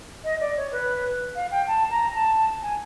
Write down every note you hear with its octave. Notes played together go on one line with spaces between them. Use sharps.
D#5
D5
C#5
B4
F5
G5
A5
A#5
A5
G#5